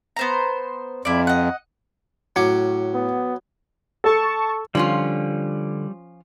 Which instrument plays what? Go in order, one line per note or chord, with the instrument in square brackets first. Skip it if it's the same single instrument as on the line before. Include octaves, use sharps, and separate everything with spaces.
[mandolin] B3 C5 A#5
[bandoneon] F2 [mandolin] E4 D5
[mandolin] D#5 F#5
[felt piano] A2 F#4 C#7 [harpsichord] F#3 C#4 D6
[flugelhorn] B3
[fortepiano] A4 [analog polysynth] A5 C#6
[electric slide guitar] D3 [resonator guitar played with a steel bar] F3 C#4 F4 [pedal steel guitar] G3